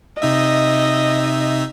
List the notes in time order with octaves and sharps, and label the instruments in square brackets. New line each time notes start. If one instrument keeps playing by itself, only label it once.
[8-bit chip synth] C3 D#4 E5 [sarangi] D#5